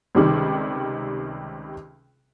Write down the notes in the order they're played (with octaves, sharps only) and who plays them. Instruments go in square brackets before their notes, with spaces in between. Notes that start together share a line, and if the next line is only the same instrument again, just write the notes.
[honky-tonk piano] C#2 C3 D#3 G3